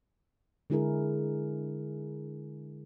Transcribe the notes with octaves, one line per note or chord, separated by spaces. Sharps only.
D3 G#3 E4 G#4 A#4